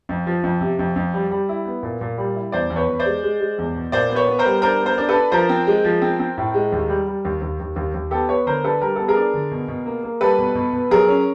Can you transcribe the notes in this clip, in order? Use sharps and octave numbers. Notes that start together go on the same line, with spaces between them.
F2
F3
F2
C3
F2
F2
G3
G3
E4
B3
A#2
A#2
G3
E4
E2 C5 D5
E2
B4 C#5
E2
C5 D5
G#3
G#3
G#3
E2
B2
A#2 C5 D5
B3
B4 C#5
B3
A#4 C5
G3
D4 A#4 C5
B3
A#4 C5
D4
A4 B4
D4
F3 A#4 C5
C4
G#3
F3
C4
C4
A2
G#3
D#2
G3
G3
D#2
D#2
D#2
D#2
D#2
B3 G4 A4
B3 B4 C#5
D3 A#4 C5
D4 A4 B4
G3 A#4
B3 A4
G#4 A#4
D4
D3
B2
B2
A#3
A#3
G3 A4 B4
B2
B2
B2
F#3 G#4 A#4
C#4